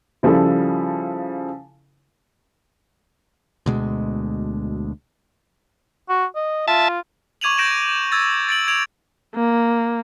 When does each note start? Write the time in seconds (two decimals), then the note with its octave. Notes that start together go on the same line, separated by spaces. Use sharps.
0.23 C#3 F3 G3 E4 A4
3.66 D2 B2 G#3
6.09 F#4
6.35 D#5
6.68 F4 E5 A5
7.41 C#6 D6 G#6 D#7 F7 F#7
7.58 G6 A#6 D7 E7 F#7
8.12 E6 G#6 A6
8.49 A6 D7 F#7
8.68 G#6 D7 F7 F#7
9.35 A#3